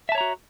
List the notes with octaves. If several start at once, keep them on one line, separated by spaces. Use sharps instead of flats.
F#4 C#5 E5 A5 A#5